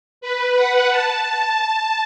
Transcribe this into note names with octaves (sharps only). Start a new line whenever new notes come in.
B4
F#5
A5